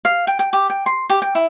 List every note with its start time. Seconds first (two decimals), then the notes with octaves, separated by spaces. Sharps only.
0.05 F5
0.27 G5
0.39 G5
0.53 G4
0.70 G5
0.86 C6
1.10 G4
1.22 G5
1.35 E4